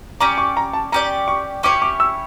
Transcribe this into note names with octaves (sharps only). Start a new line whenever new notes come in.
C#4 G4 D5 A#5
C#6
A#5
A5
C#4 G4 D5 A#5
C#6
C#4 E4 G4 C#5 D6
D6
E6